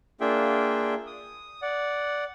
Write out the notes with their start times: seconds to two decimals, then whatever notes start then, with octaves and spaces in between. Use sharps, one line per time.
0.21 A#3 D4 F4 G#4 E5 G5
1.07 D#6
1.62 D5 F#5